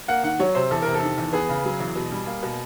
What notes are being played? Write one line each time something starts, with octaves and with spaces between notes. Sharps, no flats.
A#3 F#5
D#3 F#5
F#3 C#5
C3 C5
E2 A4
C3 A#4
A4
D#3
E2
B3 G#4
C#3
F#3
E2
B2
G3
A#3
B2